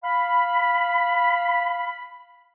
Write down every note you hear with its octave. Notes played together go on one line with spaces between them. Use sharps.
F5 B5